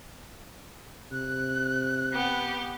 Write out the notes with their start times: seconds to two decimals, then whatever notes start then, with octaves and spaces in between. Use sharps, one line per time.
1.12 C3 F#6
2.13 B3 G4